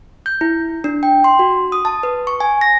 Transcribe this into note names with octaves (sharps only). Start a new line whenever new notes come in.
G6
E4
D4
G5
C6
F#4
D#6
A5
B4
C#6
G#5
A#6